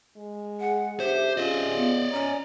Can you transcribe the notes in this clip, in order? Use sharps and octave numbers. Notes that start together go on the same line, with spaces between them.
G#3
G#4 F#5
B1 D4 G4 C5 E5
C4 C#4 F4 G4 G#4 D5 D#5
B3
C#4 C#5 A#5